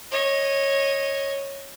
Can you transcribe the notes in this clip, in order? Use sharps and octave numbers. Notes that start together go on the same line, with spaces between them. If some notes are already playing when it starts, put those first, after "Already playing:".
C#5 D#5